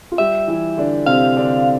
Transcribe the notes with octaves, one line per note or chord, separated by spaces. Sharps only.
F4
G3 G4 E5
E3 E4
D3 D4
C3 C4 F5
D3 D4